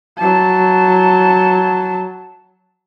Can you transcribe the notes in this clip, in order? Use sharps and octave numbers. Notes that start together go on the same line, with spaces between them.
F#3 A5